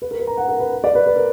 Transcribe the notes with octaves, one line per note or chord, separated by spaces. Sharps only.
B4
A#4
B4
A#5
F#5
A#4
B4
D5
B4
B4
A#4